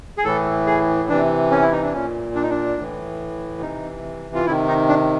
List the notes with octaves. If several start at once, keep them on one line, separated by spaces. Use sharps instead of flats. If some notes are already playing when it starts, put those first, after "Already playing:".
G#4
A2 E3 A4
G#4
C3 E3 D4
C#4
E4
D#4
D4
A#2 C#4
D4
D#4
D4
A2 E3
C3 E3 D#4
F4
C3 D#3 E4
D#4
D4